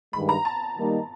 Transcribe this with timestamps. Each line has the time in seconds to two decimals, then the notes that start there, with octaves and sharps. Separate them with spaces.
0.13 G2 D#3 G#3 B5
0.29 A#5
0.45 A5
0.76 D#3 G3 A#3 D#4